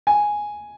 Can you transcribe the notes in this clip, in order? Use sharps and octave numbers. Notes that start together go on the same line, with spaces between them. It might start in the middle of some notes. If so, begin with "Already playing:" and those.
G#5